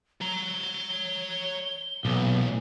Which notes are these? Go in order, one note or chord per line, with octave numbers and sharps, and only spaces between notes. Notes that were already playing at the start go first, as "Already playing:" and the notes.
C#5 A#5 G7
B1 A#2 E3